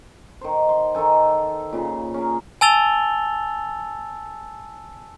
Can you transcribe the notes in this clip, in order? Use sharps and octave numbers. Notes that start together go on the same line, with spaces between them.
D#3 C5
C6
D#3 D#4 A4 G#5
A#2 C#3
C#4 G#4 A#4
G#5 A5 E6 A6 F7 G7